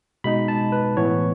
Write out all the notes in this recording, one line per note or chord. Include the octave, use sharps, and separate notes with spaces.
B2 G#3 D#4 B5
A5
B4
A2 E3 B3 E4 C#5